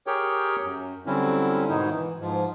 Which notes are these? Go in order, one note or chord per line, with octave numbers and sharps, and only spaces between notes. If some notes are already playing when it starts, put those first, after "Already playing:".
G4 G#4 A#4 C#5 G5
F#2
D3 F#3 G3 C4 C#4 E4
G#2 B2 D#3 D#4 E4
E3
G#2 F3